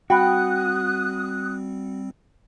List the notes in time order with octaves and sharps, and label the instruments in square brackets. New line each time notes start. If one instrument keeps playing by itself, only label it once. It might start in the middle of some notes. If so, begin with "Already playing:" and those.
[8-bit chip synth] G3 C4 [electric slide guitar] F#4 [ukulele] G5 B5 [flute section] D#6 F#6